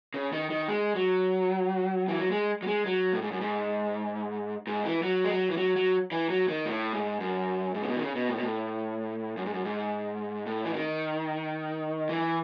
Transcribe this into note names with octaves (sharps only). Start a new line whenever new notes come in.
C#3
D#3
D#3
G#3
F#3
E3
F#3
G#3
F#3
G#3
F#3
A2
G#2
F#2
G#2
G#2
E3
F#3
G#3
F#3
E3
F#3
F#3
E3
F#3
D#3
A2
G#2
F#2
G#2
C#3
B2
D#3
C#3
B2
A2
B2
A2
F#2
G#2
F#2
G#2
A2
E3
D#3
E3